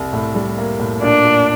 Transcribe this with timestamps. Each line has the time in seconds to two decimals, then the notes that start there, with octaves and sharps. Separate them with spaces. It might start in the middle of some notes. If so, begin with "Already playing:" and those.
Already playing: C2
0.13 A2
0.35 G3
0.58 A#3
0.79 A2
1.02 A#2 D4
1.25 A#2